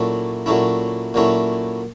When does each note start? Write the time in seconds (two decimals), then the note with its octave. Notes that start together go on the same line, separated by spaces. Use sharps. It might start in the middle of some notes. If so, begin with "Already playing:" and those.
Already playing: A#2 F#3 A3 C#4 E4
0.46 A#2 F#3 A3 C#4 E4
1.14 A#2 F#3 A3 C#4 E4